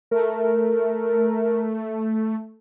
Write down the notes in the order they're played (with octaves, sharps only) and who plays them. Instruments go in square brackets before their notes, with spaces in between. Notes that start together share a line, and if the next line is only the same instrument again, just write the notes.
[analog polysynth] A3 [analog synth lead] A#4